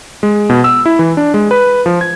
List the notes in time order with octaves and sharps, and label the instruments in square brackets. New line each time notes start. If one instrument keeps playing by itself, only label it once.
[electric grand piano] G#3
B2
E6
E4
E3
D4
G#3
B4
F3
G#6